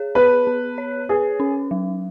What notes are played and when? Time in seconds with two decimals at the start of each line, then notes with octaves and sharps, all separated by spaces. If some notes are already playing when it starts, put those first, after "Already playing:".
Already playing: G#4 C#5
0.15 B3 B4
0.47 B3
0.78 C#5
1.09 G#4 B4
1.40 C#4
1.71 F#3